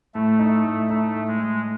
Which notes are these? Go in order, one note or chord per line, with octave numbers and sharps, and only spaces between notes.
A2 A3
D#4
A2
A3 D#4
A2
G#3
A2